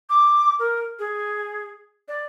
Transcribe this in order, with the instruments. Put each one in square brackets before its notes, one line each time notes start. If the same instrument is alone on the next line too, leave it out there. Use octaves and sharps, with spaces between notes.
[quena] D6
A#4
G#4
D5